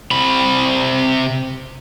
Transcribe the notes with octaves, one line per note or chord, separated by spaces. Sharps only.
C3 B5